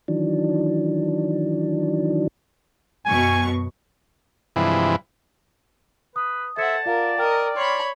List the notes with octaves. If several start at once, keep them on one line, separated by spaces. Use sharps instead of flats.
D#3 E3 F#3 D4
F#2 B2 G#5 C#6
G2 C3 E3 F3 G#3 E4
B4 D#6
A4 C5 E5 F#5 A5 G#6 C#7
F4 A#4 D5 F5 F#5
A#4 D#5 G5 F6
C#5 B5 C6